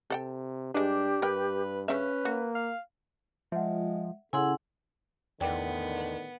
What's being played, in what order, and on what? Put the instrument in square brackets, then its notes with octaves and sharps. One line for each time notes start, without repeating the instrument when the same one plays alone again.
[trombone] C3 [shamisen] A4 F#5 G5
[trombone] G2 [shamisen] G#3 B4 [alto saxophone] D4 [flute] G4
[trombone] G2 [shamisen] A#4 G5 [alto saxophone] B4
[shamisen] C#3 E5 [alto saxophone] C#4 [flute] B4
[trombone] A#3 [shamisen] F#4
[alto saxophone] F5
[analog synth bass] F3 [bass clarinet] G#3 [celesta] E5 F#5
[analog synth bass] C#3 [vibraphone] E4 G#4 F#5 [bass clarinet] A4 [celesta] G#5 C6 E6
[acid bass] E2 [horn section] A2 D3 D#3 [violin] B3 [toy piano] D5 G5 D6